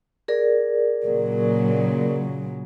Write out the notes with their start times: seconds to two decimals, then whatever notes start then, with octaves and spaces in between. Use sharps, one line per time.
0.28 G#4 A#4 D5
1.03 A#2 C#3 F#3